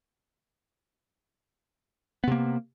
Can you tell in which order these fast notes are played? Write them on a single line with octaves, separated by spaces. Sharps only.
B3 C3 A#3